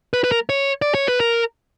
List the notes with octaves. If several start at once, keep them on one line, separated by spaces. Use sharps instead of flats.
B4
B4
A#4
C#5
D5
C#5
B4
A#4